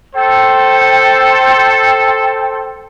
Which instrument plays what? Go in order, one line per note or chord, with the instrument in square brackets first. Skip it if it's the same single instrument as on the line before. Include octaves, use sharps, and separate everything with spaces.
[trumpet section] A4 C5 [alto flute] G5